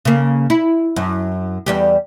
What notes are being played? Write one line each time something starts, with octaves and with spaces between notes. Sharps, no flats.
C#3 A#3
E4
F#2
E2 G3 G4